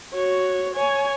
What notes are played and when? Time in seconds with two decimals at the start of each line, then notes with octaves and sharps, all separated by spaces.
0.13 F#4 C#5
0.74 C#5 G#5